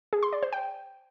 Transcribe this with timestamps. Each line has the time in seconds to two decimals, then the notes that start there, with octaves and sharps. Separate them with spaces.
0.13 G#4
0.23 C6
0.33 D5
0.43 C5
0.53 G5